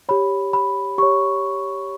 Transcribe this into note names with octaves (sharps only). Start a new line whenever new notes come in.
G4 C#5 B5
B5
G4 C#5 C#6